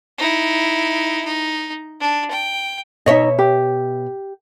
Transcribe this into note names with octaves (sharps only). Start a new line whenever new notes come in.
D#4 E4
D#4
D4
G5
B2 D#4 C#5 D#5 E5
G4